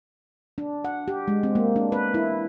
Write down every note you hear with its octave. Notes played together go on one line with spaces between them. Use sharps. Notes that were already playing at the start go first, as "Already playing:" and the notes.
D4
F#5
G4
G#3
C4
A#3
D4
B4
E4